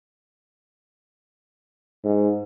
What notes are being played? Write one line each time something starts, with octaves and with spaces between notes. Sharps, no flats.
G#2